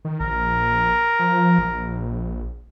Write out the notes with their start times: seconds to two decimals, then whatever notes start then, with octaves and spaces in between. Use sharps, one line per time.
0.05 D#3
0.20 A#1 A#4
1.19 F3
1.59 A#1